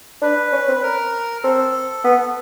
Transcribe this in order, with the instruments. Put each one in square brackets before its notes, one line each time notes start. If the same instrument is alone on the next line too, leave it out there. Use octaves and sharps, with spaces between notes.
[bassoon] D4 [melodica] B4
[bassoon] C#4
C4
[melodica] B4
A#4
[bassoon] C4 [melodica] A4
[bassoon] B3